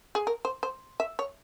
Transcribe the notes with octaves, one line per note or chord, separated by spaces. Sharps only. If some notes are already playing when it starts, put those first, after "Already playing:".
G#4
A#4
C5
C5
E5
C#5